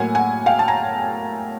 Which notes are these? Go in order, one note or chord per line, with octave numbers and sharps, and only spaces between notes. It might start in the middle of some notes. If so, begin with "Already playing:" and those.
Already playing: A2 F#3 A#3 F#5 G#5
F#5 G#5
F5 G5
A5
G#5 A#5